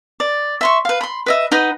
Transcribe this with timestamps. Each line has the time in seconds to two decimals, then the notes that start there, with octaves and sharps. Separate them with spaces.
0.20 D5
0.61 E5 C6 C#6
0.85 B4 F5
1.01 B5 C6
1.26 B4 D#5 E5
1.52 D#4 B4 D#5 F#5